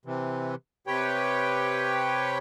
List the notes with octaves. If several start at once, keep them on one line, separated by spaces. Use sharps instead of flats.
C3 E3
C3 G4 B4 C#5 G5